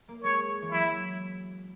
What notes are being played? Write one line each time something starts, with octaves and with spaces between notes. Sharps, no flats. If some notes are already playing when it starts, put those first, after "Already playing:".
A#3
G#3 C#5
E3
F#3 E4